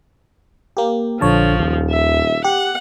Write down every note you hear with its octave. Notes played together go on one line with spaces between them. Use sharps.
A#3 G4
A#1 D3 F3 C#5 A5
D#1 D#2
E5
G4 F#5